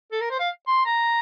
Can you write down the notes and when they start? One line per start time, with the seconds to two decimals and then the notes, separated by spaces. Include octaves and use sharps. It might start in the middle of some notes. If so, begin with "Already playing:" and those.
0.12 A4
0.21 A#4
0.30 C5
0.40 F5
0.67 C6
0.86 A#5